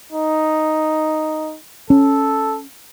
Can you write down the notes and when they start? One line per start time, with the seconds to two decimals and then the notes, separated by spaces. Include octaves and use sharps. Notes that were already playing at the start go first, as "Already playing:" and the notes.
0.12 D#4
1.90 C#4 A4